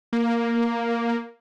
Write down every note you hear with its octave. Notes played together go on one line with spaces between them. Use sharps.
A#3